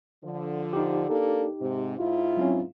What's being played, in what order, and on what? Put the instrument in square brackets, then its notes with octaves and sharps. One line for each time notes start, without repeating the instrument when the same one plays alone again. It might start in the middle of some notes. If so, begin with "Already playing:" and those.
[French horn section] D3 F3
[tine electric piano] D#4 G4
[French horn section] A#3 D4 A4
G#2 C3
G#2 E4 F4
[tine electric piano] F#3 C4 C#4